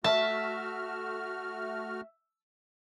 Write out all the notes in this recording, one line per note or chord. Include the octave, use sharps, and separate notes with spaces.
A3 F#4 E5 A5 F6